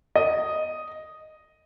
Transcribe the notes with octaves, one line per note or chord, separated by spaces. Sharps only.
D#5